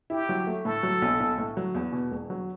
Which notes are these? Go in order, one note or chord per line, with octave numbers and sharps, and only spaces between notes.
E4 G4
F#3
A3
A2 A4
F#3
B1
B1
A2
F#3
E2
B2
E1
F#3